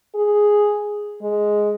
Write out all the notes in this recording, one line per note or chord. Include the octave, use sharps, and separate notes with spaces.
G#4
G#3